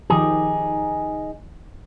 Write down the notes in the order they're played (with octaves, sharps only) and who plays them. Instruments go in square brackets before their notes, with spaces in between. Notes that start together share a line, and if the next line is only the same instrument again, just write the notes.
[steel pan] D#3 F3 G4 [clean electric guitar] D#4 G#4